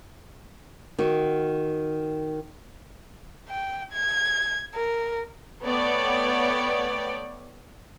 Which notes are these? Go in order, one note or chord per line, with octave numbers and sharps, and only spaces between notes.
D#3 F#4
G5
G#6
A#4
A3 B3 C#5 D5 G5